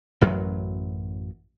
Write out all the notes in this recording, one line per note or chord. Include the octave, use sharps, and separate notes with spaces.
A1 F#2 F#3